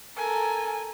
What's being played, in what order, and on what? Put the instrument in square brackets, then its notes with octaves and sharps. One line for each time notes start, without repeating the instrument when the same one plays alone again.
[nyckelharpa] A4 A#4 [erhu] G#5